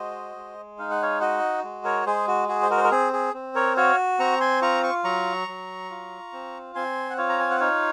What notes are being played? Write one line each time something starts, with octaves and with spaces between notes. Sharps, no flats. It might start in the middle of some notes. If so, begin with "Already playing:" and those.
Already playing: G#3 F#4 C5 D#5
G#3
D#4 F5
F#5
C#5 F5
F#4 D#5 F#5
G#3
A#4 C#5
G#3 G#4 C5
F#4
F#4 G#4
C5
F#4 A#4
C5
A#4
C4 G#4
G#4
C4
A#4 C#5
F#4 C#5 F5
C4 A#5 C#6
G#5 C6
F4 A#5 C#6
C#6
F#3 A#5 C#6
F#3
F4
C4
C4 G#5 C6
F#5
F4 C#5 F5
A#5
G#5
F#5
D#4 C#5 F5